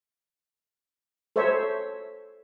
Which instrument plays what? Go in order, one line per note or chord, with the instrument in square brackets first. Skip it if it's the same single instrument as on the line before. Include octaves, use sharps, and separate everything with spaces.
[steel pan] A4 C5 C#5 E5